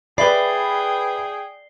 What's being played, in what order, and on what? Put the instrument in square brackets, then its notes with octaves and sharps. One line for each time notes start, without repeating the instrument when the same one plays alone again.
[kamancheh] G#4 G5 [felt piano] B4 E5 B5 [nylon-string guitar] D5 [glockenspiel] C7 G7